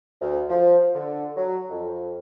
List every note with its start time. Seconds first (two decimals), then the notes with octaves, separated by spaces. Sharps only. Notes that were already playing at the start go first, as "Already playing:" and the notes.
0.21 D2
0.49 F3
0.94 D3
1.36 F#3
1.70 F2